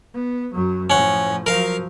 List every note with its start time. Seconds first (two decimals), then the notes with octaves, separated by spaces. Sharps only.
0.14 B3
0.54 F#2 F#3
0.90 A2 F3 C#4 F#5
1.46 F3 F#3 A#4 F5